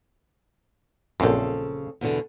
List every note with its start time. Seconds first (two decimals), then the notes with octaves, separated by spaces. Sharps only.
1.20 A#1 F#2 C#3 C4 A4
2.01 E2 B2 D3